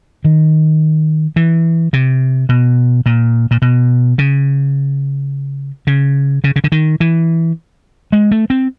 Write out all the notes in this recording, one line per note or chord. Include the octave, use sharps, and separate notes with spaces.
D#3
E3
C3
B2
A#2
A#2
B2
C#3
C#3
C#3
C#3
D3
D#3
E3
G#3
A3
C4